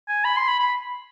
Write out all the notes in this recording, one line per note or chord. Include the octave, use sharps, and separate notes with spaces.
G#5
B5
C6
B5
B5